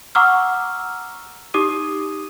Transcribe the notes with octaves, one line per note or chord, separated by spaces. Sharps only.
F#5 A#5 C#6 D6 E6 F6
D#4 G4 D6 D#6 D#7